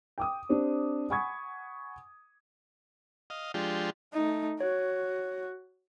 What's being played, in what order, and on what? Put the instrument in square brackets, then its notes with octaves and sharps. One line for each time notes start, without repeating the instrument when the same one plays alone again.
[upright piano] G5 D6 D#6
C4 D4 G4 C5
F#5 G#5 B5 C#6 D#6 G#6
[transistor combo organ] D#5 F5
F3 G#3 D4 F4 G4
[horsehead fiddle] A3 D#4
[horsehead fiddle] F#4 [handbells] C#5